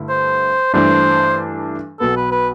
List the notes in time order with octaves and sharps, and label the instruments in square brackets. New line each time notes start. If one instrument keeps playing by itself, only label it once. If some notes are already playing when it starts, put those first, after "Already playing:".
Already playing: [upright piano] G2 D3 A3 E4
[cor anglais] C5
[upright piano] G2 E3 A3 D4 [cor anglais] C5
[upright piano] B1 B2 B3 [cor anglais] A4
[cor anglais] B4
B4